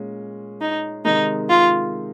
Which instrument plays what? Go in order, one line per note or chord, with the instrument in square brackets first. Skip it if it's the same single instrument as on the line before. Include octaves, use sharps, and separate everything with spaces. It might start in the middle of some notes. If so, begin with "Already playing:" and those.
Already playing: [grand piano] A#2 G#3 C#4
[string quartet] D#4
[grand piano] C3 D#3 G#3 [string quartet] D#4
[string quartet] F4